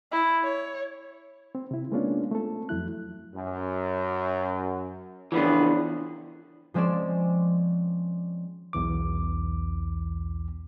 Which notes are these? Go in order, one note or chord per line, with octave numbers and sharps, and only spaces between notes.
E4
C#5
C4
C3 E4
G#3 A#3 B3 C#4 D4 F4
A3 C4 A4
F2 F#3 E4 F#6
F#2
A2 C#3 E3 F3 B3 D4
F3 G#3 C4 C#4 D5 E7
B1 E2 E3 D6